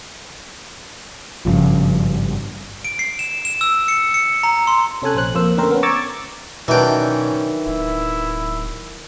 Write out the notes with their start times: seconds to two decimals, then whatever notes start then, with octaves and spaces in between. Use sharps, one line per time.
1.45 G#1 G2 C#3 F3
2.85 D7
2.99 C7
3.19 E7
3.45 E7
3.61 E6
3.88 C#7
4.14 C#7
4.43 A#5
4.67 C6
5.02 C3 C#4 A4 G#5 F#6
5.15 A#1 C5 F#6
5.35 F2 A#3 C5 E6
5.57 D3 A3 C4 C#4 A#4 C5
5.71 B3 C#4
5.83 A#5 C#6 D6 E6 G#6 A6
6.68 B2 D#3 E3 F#3 C#4 D4 G5
7.66 D1 E4